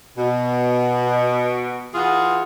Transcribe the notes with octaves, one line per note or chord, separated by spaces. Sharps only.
B2
E3 F4 F#4 G#4